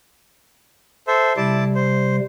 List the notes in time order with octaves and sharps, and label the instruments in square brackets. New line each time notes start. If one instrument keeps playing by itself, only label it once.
[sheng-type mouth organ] A4 C5 E5
[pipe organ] C3 G3 [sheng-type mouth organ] E4 A5 D6
[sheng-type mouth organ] C5